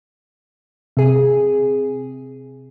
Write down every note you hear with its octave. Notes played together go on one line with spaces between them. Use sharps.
C3 G#4